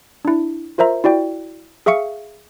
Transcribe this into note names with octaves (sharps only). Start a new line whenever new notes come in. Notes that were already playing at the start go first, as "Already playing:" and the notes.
D4 E4
F4 A#4 C5 E5 A#5
E4 F#4 D5 G5
G#4 E5 F5 C#6 C#7